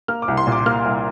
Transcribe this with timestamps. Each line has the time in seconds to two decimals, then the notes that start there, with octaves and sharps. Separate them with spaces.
0.08 A#3 F6
0.22 D6
0.28 C2
0.37 C6
0.47 A#2
0.52 D6
0.66 A#3 F6
0.86 C2